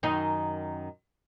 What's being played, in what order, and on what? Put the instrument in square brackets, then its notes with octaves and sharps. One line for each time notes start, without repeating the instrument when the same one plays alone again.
[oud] F#2 D#3 D#4